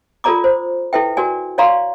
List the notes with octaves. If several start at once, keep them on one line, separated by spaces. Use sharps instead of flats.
F4 A4 A#4 D5 A#5 D6
C5
E4 A4 B4 E5 G5
F#4 A#4 D5 G#5
C#5 D5 F5 A#5 C6 C#6